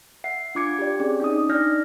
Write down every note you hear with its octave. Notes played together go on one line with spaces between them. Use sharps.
E5 F#5 C7
D4 F4 D6 G#6 C#7
G4 D5
C4 C#4 G#4 D5
C#4 D#4 D#6
D4 D#4 D5 F6 G6 A#6